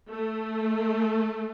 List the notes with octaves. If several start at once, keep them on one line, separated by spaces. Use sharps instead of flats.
A3